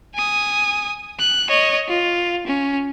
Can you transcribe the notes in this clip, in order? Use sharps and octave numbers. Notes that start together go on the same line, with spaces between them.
G#5 D#6
F#6
C#5 D#5
F4
C#4